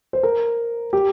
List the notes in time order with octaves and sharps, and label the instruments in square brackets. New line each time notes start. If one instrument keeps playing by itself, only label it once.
[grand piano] C5
A#4
G4